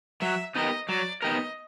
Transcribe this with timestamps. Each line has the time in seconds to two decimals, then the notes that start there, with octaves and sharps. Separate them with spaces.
0.21 F#3 E5
0.55 B3 D#4 G4 A#4 D#5
0.89 F#3 D5
1.22 B3 D#4 G4 A#4 D#5